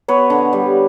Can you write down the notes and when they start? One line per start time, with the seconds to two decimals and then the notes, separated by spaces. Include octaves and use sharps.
0.08 B3 B4 C#5
0.30 D3
0.53 G3